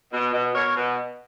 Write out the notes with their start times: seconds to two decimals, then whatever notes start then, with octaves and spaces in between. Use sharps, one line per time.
0.13 B2
0.33 B2
0.54 B2 A#4 C#5
0.75 B2